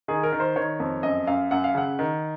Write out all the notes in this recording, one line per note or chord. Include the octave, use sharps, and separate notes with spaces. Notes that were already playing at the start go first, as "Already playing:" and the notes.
D#3 G#4
A#4
D#3
C5
D#3 C#5
F2
F#2 D#5
F#2 F5
F#2 F#5
F5
C#3 F#5
D#3